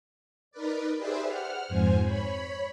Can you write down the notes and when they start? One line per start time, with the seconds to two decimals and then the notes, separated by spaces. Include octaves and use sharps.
0.51 D#4 A#4 B4 D5
0.97 G4 G#4 B4 C5 D5 E5
1.25 F#5 F6
1.69 F2 G#2 C5 G#5
2.03 C#5 B5